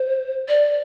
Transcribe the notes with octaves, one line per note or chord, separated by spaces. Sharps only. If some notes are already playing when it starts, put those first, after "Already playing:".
Already playing: C5
D5